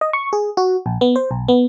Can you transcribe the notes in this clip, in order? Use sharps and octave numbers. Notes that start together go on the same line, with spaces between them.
D#5
C#6
G#4
F#4
A#1
B3
C5
B1
B3